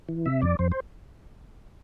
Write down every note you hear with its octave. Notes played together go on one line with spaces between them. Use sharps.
E3
C3 E5
F2 D5
F2 C5
C5